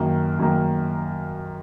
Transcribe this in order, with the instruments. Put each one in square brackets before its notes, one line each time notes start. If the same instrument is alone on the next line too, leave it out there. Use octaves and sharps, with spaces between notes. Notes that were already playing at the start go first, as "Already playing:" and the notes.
Already playing: [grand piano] F#2 D#3 A#3
F#2 D#3 A#3